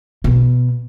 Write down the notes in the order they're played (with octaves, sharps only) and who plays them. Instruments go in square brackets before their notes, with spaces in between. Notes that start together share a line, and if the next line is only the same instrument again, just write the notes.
[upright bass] B2